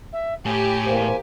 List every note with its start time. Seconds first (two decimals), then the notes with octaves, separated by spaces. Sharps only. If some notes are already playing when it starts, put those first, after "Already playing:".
0.12 E5
0.45 A2 G4 G#5
0.87 E2 A#3 C5